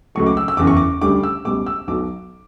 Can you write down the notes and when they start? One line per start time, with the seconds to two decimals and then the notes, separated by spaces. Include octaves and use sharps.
0.15 C#2 C#3 F#3 A3 C#6
0.26 D6
0.37 E6
0.48 E6
0.57 F#1 E2 C#3 D6
0.67 C#6
0.77 D6
1.02 D2 C#3 G3 D6
1.23 E6
1.45 C#2 B2 G3 D6
1.66 E6
1.88 B1 B2 F#3 D6